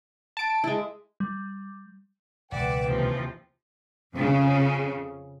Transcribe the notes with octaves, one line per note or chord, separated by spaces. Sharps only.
A5 D7
G#3 E4
G3
E1 C#2 B4 D5 E5 F#5 G5 D6
D#2 C3 E3 F3
F2 C#3